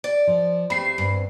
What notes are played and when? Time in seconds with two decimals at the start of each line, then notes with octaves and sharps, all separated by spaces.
0.04 D5
0.27 F3
0.70 E2 G2 A3 C4 B5 C7
0.98 D2 G2 C4